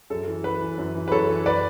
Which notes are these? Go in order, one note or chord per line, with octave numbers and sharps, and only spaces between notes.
F#2 A4
E3
F#2 B4
E3
F#2
E3
B4
F#2 A4 C#5
E3
B4 D5